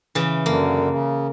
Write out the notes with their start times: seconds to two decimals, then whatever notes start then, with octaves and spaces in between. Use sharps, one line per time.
0.15 C#3 E3
0.46 F#2 D3 A#3
0.90 C#3